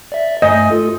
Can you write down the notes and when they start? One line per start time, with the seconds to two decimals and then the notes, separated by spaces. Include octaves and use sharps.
0.12 D5 E5
0.42 G2 A3 D#5 G#5
0.71 F4 A4